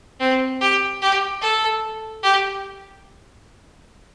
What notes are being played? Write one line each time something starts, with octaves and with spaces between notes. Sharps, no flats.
C4
G4
G4
A4
G4